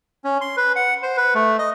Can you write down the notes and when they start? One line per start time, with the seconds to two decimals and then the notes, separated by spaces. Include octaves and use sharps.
0.24 C#4
0.41 C6
0.57 B4
0.76 F#5
1.03 C5
1.17 B4
1.35 A3
1.59 D#5